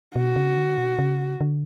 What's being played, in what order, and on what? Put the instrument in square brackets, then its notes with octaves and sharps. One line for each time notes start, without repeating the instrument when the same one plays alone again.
[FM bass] B2 [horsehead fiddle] F#4
[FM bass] C#3
D3
B2
C#3
D3